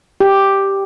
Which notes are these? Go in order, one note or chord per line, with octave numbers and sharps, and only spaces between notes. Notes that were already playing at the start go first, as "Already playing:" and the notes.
G4